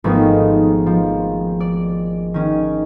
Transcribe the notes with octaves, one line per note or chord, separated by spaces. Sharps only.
G#1 F3 A3 B3 D#4
F3
D5
D#3 C#4